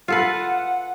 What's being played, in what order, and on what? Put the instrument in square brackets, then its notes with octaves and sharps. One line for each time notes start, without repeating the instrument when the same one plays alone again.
[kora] F4 A4 B4 [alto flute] F#5